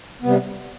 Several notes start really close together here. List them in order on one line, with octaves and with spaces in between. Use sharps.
B3 C3 G3